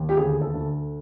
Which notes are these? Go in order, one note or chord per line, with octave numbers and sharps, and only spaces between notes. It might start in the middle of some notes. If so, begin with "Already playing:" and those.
Already playing: D#2
G4
D2 G#4
A4
D2